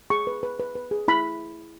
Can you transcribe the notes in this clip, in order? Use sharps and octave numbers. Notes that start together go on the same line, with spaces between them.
G#4 C#6
B4
B4
B4
B4
G#4
E4 B5